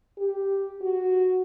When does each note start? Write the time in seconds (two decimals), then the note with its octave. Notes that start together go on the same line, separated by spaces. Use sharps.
0.18 G4
0.81 F#4